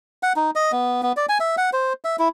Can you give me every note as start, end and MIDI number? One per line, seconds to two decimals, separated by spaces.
0.23 0.33 78
0.36 0.51 63
0.55 0.72 75
0.72 1.01 59
1.03 1.12 59
1.17 1.26 74
1.29 1.38 80
1.40 1.56 76
1.58 1.70 78
1.73 1.93 72
2.05 2.16 76
2.19 2.28 64